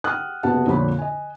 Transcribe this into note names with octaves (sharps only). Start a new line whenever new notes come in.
F#5 G5 D#6 F6 F#6
F#1 C3 B3 F#4 F#5 A5
F2 A#2 D3 C#5 B5
D#5 G#5